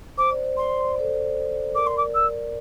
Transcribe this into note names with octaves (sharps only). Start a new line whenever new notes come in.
C5 D6
D5
C5
D5 C6
C5
D5
A4 C5
A#4 D5 D6
C6
D6
E6